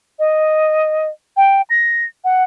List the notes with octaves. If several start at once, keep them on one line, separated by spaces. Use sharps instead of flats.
D#5
G5
A#6
F#5